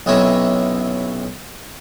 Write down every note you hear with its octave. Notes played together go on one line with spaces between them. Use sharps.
B1 C3 C#4 E4 C#5 A#5